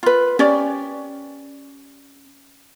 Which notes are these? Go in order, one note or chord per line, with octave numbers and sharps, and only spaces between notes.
F4 B4
C#4 G4 D5